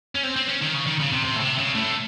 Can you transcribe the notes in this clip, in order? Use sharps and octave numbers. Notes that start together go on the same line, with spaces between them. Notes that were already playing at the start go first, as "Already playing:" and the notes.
C#4
C4
C4
C#4
D#3
C#3
D#3
C#3
C3
C3
A2
C3
C#3
A2